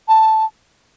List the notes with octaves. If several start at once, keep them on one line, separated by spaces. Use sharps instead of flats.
A5